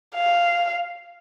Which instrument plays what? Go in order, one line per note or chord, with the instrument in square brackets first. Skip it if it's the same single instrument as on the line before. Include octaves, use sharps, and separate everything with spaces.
[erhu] F5